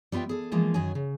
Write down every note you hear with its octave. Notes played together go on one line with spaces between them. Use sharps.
G3 B3 F4 E5 G5
G#4 A4
E3 F3 G#3 A#3 F4
F#2 D#3 F#3 F#4 G#4 G#5
C#3